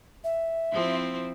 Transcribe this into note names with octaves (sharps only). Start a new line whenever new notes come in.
E5
F3 C4 E4